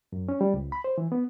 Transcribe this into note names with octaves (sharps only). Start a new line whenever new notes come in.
F#2
C#4
G3
C#2
B5
C5
E3
B3